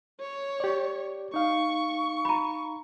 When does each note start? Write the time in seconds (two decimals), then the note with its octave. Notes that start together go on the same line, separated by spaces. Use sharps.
0.20 C#5
0.60 G4 D5
1.34 D#4 F5 C#6
2.25 A#5 B5